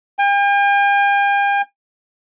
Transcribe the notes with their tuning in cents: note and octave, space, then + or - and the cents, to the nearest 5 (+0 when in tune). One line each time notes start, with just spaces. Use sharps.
G5 +45